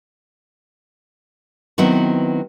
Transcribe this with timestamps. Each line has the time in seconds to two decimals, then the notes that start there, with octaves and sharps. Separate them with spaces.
1.78 D#3 F#3 B3 C4 E4